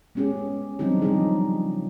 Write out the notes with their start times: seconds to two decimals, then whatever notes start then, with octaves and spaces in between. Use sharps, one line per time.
0.15 G#3 B3 C#4 G4 G#4
0.79 F#3 G3 C4 D4 D#4 G4
1.01 C#3 F3 G3 D#4 G#4